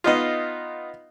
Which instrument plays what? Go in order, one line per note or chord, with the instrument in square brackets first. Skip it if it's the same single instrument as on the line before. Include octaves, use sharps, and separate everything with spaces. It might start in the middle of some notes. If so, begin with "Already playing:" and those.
[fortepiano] B3 D#4 F4 [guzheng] D#5 F5